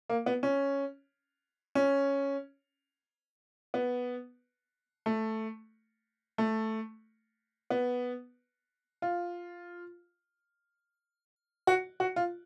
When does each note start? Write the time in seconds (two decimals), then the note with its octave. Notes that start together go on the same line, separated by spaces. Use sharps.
0.10 A#3
0.26 B3
0.43 C#4
1.75 C#4
3.74 B3
5.06 A3
6.38 A3
7.70 B3
9.02 F4
11.67 F#4
12.00 F#4
12.16 F4